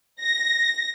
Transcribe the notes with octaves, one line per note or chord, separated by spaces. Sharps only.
A#6